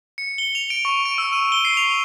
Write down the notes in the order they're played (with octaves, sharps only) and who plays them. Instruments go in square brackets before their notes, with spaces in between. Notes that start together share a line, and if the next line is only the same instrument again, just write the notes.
[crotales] C#7
G7
F7
D7
C#6
D7
E6
D#7
G7
C7
F7